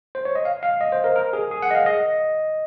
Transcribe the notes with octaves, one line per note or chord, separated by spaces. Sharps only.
C5
C#5
D#5
F5
F5
D#5
C5
A#4
A#4
G#4
G#4
F#5
D#5
F5
D#5